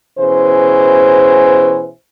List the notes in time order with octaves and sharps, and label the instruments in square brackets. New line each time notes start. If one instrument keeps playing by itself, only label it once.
[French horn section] B2 E3 C#4 G#4 C5